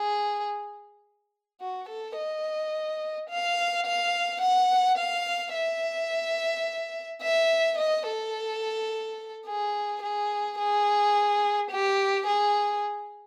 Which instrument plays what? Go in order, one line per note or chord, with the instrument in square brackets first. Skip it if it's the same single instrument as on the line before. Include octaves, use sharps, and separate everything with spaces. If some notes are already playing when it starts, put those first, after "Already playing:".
Already playing: [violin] G#4
F#4
A4
D#5
F5
F5
F#5
F5
E5
E5
D#5
A4
G#4
G#4
G#4
G4
G#4